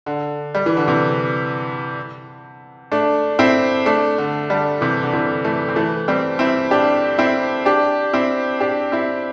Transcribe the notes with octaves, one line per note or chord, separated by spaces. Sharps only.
D3
G3
E3
D3
C3 E3
A3 D4
C4 E4
A3 D4
D3
D3 G3
C3 E3
D3
C3 E3
E3 A3
C4
E3 A3
G3 C4
C4 E4
D4 G4
C4 E4
D4 G4
C4 E4
D4 G4
C4 E4